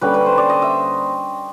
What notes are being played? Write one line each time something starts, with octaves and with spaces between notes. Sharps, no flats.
D3 G3 A#3 C#4 B4
B4
C5
D5
D#5
E5